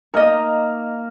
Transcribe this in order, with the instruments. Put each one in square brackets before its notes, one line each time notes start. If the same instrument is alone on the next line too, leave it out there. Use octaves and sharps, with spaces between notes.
[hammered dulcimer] A#3 A#4 [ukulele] D#4 D#5